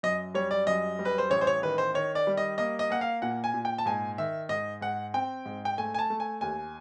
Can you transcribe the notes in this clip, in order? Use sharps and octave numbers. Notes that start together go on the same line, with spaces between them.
F#2 D#5
G3 C#5
D5
F#2 D#5
G3
B4
C5
A1 C#5
C5
C#5
D#3 B4
C5
D#3 C#5
D5
G3
D#5
A#3 D#5
D#5
A#3 F#5
F5
A#2 F#5
G#5
A#2
G5
A5
G#2 G#5
D#3 E5
G#2 D#5
G#2 F#5
C4 G5
G#2
G5
A3 G#5
G#5
A5
A3
G#5
D#2 G#5